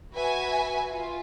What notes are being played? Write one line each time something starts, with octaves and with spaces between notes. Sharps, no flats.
F#4 B4 E5 G#5
F4